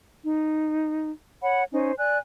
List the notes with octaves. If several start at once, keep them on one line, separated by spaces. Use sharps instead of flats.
D#4
C#5 F#5 B5
C#4 D#4 C5
D5 G#5 F#6